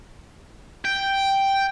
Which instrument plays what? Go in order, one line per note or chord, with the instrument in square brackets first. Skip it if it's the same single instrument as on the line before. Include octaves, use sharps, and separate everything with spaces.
[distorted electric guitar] G5